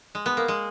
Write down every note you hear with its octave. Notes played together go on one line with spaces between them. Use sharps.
G#3
B3
A#3
G#3